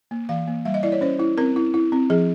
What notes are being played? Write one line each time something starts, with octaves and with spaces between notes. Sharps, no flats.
A#3
E3 F5
A#3
G3 E5
D#5
E4 D5
C#5
C#4 C5
E4
C4 A#4
E4
E4
C4
F3 G#4